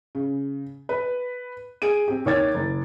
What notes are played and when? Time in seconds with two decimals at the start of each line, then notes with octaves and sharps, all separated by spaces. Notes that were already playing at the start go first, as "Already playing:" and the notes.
0.15 C#3
0.89 B4
1.82 G#4 D7 D#7
2.08 C4 G4
2.26 D#2 D#3 C#5 D6 G#6 A6
2.54 F#1